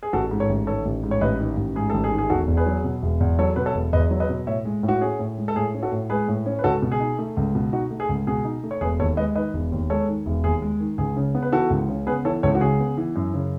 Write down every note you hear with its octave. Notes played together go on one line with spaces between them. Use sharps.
G#4
A1 F#4 A4
G#2
A4 C#5
A1
D#3 A4 C#5
A1
G#2
C#5
A1 B4 D#5
D#3
A1
G#2 G#4
A1 A4
G#4
D#3
G#4
E1 F#4 A4
E2
G#4 B4
F#3
B2
E1
E2
F#3 A4 C#5
B2 B4
A4 C#5
E1
E2 B4 D#5
F#3
B4 D#5
B2
A2 C#5 E5
G#3
A2
F#4
C#4 G#4
A2
G#3
A4
A2 G#4
C#4
F#4 A4
A2
G#3 G#4 B4
A2
C#4
B4
C#2 F#4 A4
B2
G#4
D#4
A3
C#2
B2
D#4 F#4
A3
G#4
C#2
B2 G#4
D#4
A3
C#5
E1 G#4 B4
D#2 A4 C#5
G#3 B4 D#5
D#3 B4 D#5
E1
D#2
G#3 A4 C#5
D#3
E1
D#2 G#4
G#3
D#3
C#2 G#4
C#3
B3
B4
E3 F#4 A4
C#2
C#3
B3 G#4 B4
E3 A4 C#5
C#2 A4 C#5
F#4
C#3 G#4
B3
E3
F#2
C#3